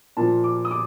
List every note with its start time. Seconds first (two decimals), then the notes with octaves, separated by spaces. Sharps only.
0.17 A#2 F3 A5
0.44 D6
0.65 D#6
0.71 D6